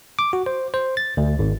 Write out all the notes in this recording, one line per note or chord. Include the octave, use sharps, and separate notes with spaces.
D6
F#4
C5
C5
A6
D2
G#1